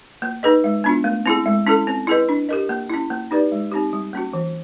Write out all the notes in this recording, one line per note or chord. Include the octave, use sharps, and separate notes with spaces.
A#3
D#4 G#4 B4 D#5
G#3
B3 D4 F4
A3
C4 E4 G#4
G#3
C#4 E4 A4
C4
E4 G#4 B4 D#5
D4
G4 A#4 D#5
A#3
C#4 E4
A#3
D#4 G4 B4 D5
G#3
C4 D#4 G4
G3
A#3 C#4 F#4
E3